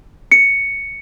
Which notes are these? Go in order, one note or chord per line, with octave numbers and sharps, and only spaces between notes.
C#7